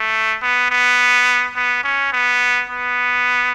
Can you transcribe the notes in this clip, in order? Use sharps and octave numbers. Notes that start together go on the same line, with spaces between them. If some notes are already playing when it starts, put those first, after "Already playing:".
Already playing: A3
B3
B3
B3
C#4
B3
B3